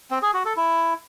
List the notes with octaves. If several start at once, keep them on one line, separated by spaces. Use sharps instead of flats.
C4
G#4
F#4
A4
E4